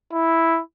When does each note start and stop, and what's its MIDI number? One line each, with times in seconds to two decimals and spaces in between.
0.12 0.61 64